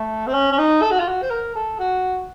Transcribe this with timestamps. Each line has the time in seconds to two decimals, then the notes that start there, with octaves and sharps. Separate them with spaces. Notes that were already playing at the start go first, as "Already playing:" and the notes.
Already playing: A3
0.27 C4
0.34 C#4
0.52 C#4
0.58 D#4
0.82 A4
0.91 F#4
1.00 F4
1.08 F#4
1.22 C5
1.30 A#4
1.55 A4
1.79 F#4